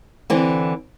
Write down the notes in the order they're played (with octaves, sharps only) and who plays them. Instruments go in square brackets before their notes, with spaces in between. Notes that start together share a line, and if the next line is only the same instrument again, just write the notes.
[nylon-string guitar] D3 E3 C4